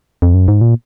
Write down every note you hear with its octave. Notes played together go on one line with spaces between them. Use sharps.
F2
F#2
G#2
A#2